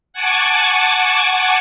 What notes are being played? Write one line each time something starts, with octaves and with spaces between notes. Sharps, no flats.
F#5 G#5 A5 C#6 D6